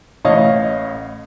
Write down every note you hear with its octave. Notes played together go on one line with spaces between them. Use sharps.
A1 A2 C#5 D#5 F5